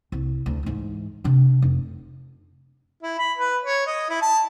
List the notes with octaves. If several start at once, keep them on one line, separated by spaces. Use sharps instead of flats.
C2
D2
G#2 E3
C3 D4
F1
E4
B5
B4
C#5
D#5
E4
A5